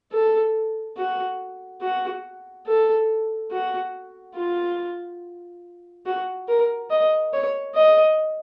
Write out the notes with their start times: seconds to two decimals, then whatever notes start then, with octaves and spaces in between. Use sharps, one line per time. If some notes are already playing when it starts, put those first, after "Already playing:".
0.12 A4
0.97 F#4
1.81 F#4
2.66 A4
3.51 F#4
4.36 F4
6.06 F#4
6.48 A#4
6.90 D#5
7.33 C#5
7.75 D#5